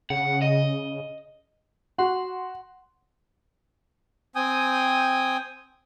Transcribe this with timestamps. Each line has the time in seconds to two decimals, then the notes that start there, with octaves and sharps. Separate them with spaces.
0.10 C#3 F#5
0.42 D#5
1.98 F#4 F#5 C6
4.35 C4 G5 G#5 D#6